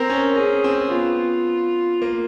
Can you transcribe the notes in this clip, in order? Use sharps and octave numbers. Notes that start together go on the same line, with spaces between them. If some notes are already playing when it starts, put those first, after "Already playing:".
Already playing: C4 A#4
C#4
C#4 G#4
C4
B3 F4
A#3